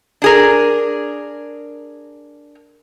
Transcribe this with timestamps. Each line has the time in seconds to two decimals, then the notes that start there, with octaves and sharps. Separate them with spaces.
0.22 D4 G#4 A#4